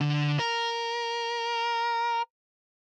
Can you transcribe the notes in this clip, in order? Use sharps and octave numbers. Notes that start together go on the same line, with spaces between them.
D3
A#4